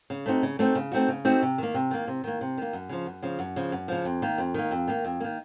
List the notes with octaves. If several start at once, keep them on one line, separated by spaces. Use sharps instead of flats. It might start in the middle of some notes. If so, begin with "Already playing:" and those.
C#3
A3 C4 D#4 F#4
C#3
A3 C4 D#4 F#4
C#3
A3 C4 D#4 F#4
C#3
A3 C4 D#4 F#4
C3
D#3 A#3
C3
D#3 A#3
C3
D#3 A#3
C3
D#3 A#3
F#2
C#3 F3
F#2
C#3 F3
F#2
C#3 F3
F#2
C#3 F3
F2
D#3 A#3
F2
D#3 A#3
F2
D#3 A#3
F2
D#3 A#3